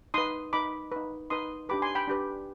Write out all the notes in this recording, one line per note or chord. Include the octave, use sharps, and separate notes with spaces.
D#4 B4 C6 D#6
D#4 B4 B5 D6
D#4 B4
D#4 B4 C6 D#6
D4 G4 B4 B5 D6
G#5 C6
G5 B5
D4 G4 B4